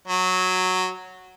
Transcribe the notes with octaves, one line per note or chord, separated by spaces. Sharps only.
F#3